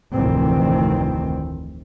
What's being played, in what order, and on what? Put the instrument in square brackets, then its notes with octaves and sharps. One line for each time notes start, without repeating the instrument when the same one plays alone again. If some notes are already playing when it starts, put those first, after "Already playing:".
[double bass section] F1 D2 A2 D#3 E3 C4